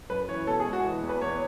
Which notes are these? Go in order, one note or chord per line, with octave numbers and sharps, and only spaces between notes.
F#2 B4
E3 C#5
B2 A4
G#4
G#3
F#4
E3
E2
B4
E2 C#5